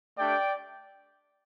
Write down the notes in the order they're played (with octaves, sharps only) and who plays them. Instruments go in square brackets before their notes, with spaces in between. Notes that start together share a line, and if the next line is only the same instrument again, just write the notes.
[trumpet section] A3 D4 G4 D5 G5